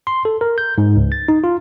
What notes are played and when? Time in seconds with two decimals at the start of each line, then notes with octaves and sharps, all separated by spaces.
0.07 C6
0.25 A4
0.41 A#4
0.58 G6
0.78 G#2
0.96 C#2
1.12 A6
1.28 D#4
1.44 F4